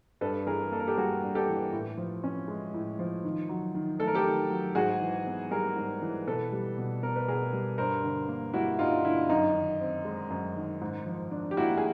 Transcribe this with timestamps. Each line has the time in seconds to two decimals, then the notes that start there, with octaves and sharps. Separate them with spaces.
0.21 G2 A4 B4
0.46 E3 G#4 A#4
0.72 A#3 A4
0.80 A#4
0.87 G4 A4
0.97 G3 F#4 G#4
1.23 G2
1.35 G4 A4
1.48 E3
1.72 A2
1.97 F3
2.24 C#4
2.48 G#3
2.74 A2
2.99 F3
3.24 D#3
3.49 F#3
3.75 D#3
3.99 A3 A4
4.07 A#4
4.15 G4 A4
4.25 D#3
4.50 F#3
4.75 G#2 F#4 G#4
5.01 E3
5.27 B3
5.51 G3 G#4 A#4
5.76 G#2
6.02 E3
6.27 B2 A4 B4
6.52 G3
6.78 B2
7.03 B3 A#4
7.16 B4
7.28 B2 G#4 A#4
7.53 G3
7.78 G2 A#4 C5
8.04 D3
8.28 A#3
8.54 G3 E4 F#4
8.79 G2 D#4 F4
9.04 D3 E4
9.29 F#2 D#4
9.54 D#3
9.81 C4
10.05 G#3
10.30 F#2
10.56 D#3
10.81 G#2
11.06 F3
11.31 D4
11.51 G4
11.57 A#3 E4 F#4
11.78 G#4